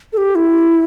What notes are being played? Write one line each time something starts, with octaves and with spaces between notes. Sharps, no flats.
A4
G4
E4